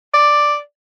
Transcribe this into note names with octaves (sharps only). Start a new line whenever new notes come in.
D5